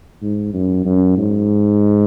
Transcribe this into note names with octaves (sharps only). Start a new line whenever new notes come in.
G#2
F#2
F#2
G#2